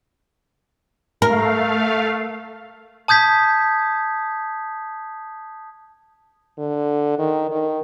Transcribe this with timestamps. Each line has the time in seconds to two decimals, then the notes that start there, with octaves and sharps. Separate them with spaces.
1.22 A3 A#4 F5
3.08 A5 D#6 G6 G#6 B6
6.58 D3
7.18 D#3
7.51 D#3